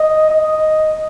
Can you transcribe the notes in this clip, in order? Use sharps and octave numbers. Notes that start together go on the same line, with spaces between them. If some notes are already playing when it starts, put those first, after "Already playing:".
Already playing: D#5
D#5